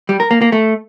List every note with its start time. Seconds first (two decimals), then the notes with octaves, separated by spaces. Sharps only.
0.09 G3
0.20 A#4
0.31 A#3
0.42 A#3
0.52 A3